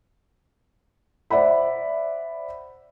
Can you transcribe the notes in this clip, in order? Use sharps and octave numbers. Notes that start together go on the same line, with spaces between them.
C5 D5 E5 F#5 B5